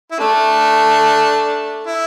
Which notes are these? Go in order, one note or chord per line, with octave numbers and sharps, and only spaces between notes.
E4
A3 D4
E4